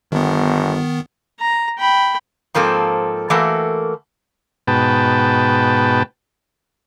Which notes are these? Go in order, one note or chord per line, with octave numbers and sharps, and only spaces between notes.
G1 D#3 B3
A#5
G5 B5
G#2 F3 A#3 C4 A4
E3 A3 A#3 F#4 A4 A#4
G#2 B2 B4 G5 A5